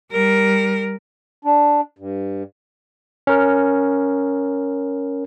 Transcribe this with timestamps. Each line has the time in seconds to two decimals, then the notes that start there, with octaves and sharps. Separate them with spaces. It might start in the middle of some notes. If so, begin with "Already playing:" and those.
0.12 G3 A#4
1.45 D4
1.99 G2
3.27 C#4 A#4